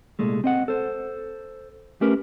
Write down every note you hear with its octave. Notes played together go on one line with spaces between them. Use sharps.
C2 A#2 G#3 A3
C4 D#5 F#5
A4 C5
A3 C#4 G4 A#4 B4